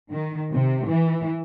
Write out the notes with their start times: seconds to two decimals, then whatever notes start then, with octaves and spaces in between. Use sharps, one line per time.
0.11 D#3
0.53 C3
0.89 E3